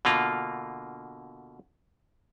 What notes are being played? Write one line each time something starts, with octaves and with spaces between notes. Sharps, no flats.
B2 D3 A#3 F4